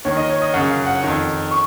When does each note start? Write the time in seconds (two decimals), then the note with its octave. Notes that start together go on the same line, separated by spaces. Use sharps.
0.05 D#2 D#3 C#5
0.17 D#5
0.30 C#5
0.42 D#5
0.54 F#2 F#5
0.58 C#3
0.70 F5
0.86 F#5
1.03 F2 D#3
1.51 C#6